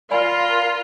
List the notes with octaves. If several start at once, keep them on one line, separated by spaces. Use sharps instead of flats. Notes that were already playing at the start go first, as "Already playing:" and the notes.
F4 A#4 D5 F5 G#5 B5